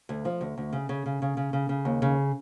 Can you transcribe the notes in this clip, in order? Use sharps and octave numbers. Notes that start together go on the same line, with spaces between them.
D2
F3
D2
D2
C#3
C#3
C#3
C#3
C#3
C#3
C#3
D#2
C#3